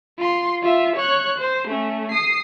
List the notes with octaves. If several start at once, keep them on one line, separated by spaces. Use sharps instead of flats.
F4 C6
F4 E5
C#5 F#6
C5
A3 C#4
D#6 C7